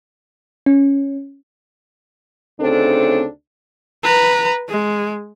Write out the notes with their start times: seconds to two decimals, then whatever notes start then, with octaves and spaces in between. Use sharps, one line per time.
0.66 C#4
2.61 D2 C#3 C4 D4 D#4 A4
4.03 B4 A#5
4.69 G#3